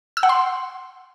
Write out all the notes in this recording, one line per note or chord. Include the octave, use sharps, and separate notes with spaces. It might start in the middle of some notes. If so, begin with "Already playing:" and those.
E6
F#5
C6